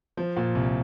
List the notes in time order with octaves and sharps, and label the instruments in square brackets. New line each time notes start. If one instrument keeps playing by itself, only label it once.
[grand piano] F3
A#2
C2